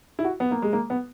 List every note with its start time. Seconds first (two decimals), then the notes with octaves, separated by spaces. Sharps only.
0.19 E4
0.25 F#4
0.40 B3
0.51 A#3
0.62 G#3
0.73 A#3
0.90 B3